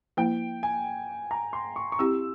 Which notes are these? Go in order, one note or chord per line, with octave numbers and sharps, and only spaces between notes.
F3 A#3 E4 G5
G#5
A#5
C6
C#6
C#6
C4 E4 G4 E6